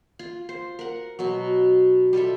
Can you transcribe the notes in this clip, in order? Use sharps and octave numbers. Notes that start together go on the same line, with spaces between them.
F4
C5
A#4 F#5
B2 F#3
G3 F4 A4 E5